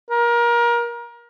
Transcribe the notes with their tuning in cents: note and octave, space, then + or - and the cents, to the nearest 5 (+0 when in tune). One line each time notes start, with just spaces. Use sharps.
A#4 +25